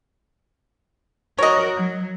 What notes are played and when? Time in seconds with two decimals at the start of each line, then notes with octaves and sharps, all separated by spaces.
1.38 F#4 A#4 C#5 D#5
1.76 F#3